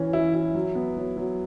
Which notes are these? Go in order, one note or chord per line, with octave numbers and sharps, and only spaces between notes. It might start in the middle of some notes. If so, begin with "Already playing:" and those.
Already playing: E3 C#4
E4
E4
F#3
B3
F#3
F#3